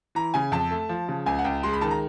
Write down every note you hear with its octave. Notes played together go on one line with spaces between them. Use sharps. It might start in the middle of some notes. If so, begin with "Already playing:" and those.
E3 A#5
C#3 G#5
F2 A5
A3
F3
C#3
C#2 G#5
F#5
C#2 G5
G#3 C6
B5
D#3 A5
A#5